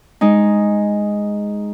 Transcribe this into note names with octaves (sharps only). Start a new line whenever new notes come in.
G#3 D#4